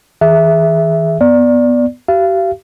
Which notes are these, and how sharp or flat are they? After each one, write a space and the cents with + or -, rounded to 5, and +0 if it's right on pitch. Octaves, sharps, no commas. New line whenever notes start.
E3 -40 G#4 +5 E5 +0
B3 +0 D5 +0
G4 -40 F5 -35